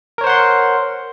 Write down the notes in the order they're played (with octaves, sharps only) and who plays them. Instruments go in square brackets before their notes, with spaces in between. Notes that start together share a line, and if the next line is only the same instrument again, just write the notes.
[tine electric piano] A#4
C#5
C5
F#5
C6